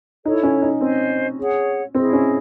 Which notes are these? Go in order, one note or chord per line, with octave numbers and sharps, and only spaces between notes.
D#4 E4 A4 C#5
C#4
D#4
C4 C5 D#5 G#5
G#4 C#5 F#5
C4 E4 G#4 D#5
C#4